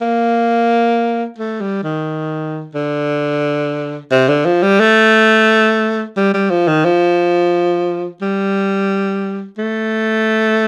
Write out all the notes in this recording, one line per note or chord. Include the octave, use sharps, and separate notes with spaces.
A#3
A3
G3
D#3
D3
C3
D3
F3
G3
A3
G3
G3
F3
D#3
F3
G3
A3